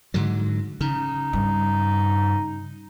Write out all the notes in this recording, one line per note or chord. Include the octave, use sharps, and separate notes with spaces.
G#2 D3 F#3
C#3 D#4
G2